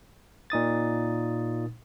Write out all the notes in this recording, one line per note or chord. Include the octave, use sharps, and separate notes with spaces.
A#2 D#4 D#6 A6